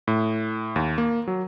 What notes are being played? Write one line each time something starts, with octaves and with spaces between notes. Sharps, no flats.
A2
D#2
A#3
F#3